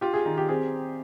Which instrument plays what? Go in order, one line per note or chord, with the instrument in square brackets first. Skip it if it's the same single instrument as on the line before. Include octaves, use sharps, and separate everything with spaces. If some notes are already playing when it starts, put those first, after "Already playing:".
[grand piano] F4 [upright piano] G4
[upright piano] G#4
[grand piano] D#3
[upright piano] G4
[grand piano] C4 [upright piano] G#4